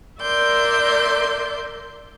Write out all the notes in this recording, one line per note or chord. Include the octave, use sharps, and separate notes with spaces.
A#4 D5 E5 C6 G6